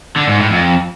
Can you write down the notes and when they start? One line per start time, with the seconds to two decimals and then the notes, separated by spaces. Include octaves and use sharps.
0.16 D3
0.27 G#2
0.39 A2
0.50 F2